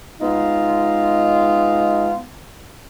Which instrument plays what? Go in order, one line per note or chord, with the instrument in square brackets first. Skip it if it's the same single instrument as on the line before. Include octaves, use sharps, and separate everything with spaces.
[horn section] G#3 B3 D#4 F4